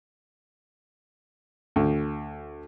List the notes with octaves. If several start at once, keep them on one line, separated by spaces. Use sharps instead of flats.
D2